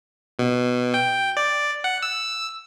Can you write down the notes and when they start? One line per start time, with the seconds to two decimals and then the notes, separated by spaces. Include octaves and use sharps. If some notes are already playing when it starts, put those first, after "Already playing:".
0.39 B2
0.94 G5
1.37 D5
1.84 F#5
2.03 E6